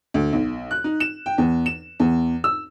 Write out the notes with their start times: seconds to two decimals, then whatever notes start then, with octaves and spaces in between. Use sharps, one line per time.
0.14 D2
0.33 B1
0.71 F#6
0.84 D#4
1.00 E7
1.26 G5
1.38 E2
1.66 E7
2.00 E2
2.44 E6